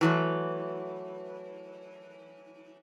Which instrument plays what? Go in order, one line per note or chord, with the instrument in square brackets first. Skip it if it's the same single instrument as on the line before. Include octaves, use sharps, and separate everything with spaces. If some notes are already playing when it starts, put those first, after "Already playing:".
[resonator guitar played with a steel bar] E3 F#3 A3